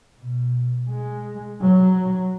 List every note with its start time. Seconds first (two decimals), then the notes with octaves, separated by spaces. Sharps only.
0.19 B2
0.89 G#3
1.61 F#3